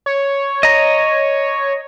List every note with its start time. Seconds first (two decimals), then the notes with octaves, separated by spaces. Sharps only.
0.06 C#5
0.63 D#5 A#5